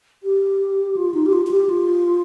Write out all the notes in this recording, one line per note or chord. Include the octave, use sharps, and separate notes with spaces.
G4
F4
D#4
G4
F4
F4
G4
F4